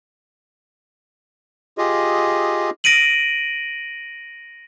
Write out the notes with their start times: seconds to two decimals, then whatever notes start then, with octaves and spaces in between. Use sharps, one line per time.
1.78 F4 G4 G#4 D#5
2.84 A#6 D7 D#7 F#7